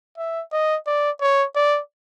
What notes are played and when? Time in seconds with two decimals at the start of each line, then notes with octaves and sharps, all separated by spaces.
0.18 E5
0.52 D#5
0.87 D5
1.21 C#5
1.55 D5